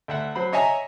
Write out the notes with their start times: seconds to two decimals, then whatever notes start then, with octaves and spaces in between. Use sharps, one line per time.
0.08 D2 E5 F#5
0.35 F#3 C5 B5
0.52 C#5 D#5 E5 G#5 A#5